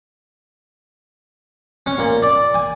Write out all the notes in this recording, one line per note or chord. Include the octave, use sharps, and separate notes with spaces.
C#4
A#2
D5
G#5